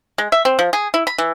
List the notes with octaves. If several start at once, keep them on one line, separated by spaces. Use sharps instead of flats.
G#3
E5
C4
F3
G#4
E4
B5
E3